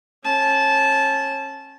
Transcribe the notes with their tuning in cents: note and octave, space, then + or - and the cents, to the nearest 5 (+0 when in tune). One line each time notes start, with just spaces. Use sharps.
C#4 -30 A5 -15